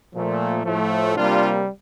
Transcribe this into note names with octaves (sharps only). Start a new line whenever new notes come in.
A#2 F3 A3
A2 F3 A3
C3 G3 A#3 D4 F4